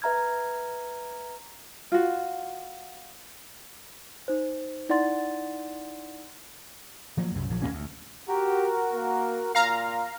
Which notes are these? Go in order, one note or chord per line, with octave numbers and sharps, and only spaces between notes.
B4 E5 A#5 F6 G#6
F4 F#4
D#4 C5
D#4 E4 D5 F#5 C6 A6
F3 F#3 A#3
C2 F#2
A#1 F3 F#3
D#2 A#2 A#3 C#4
D2
F#4 G4 A#4
A#3
A#2 F5 A#5